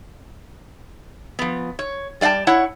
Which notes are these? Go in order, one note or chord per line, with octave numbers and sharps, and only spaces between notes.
F3 B3
C#5
G3 D5 F5 G5 A5
E4 C#5 F#5